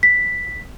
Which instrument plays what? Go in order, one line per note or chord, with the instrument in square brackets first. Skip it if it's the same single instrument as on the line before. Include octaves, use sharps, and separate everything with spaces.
[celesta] B6